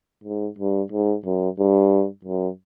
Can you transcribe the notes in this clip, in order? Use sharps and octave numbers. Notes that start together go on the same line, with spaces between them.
G#2
G2
G#2
F#2
G2
F#2